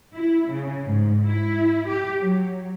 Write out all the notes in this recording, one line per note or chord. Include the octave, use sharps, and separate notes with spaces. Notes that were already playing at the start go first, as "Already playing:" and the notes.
E4
C#3
G#2
E4
G4
F#3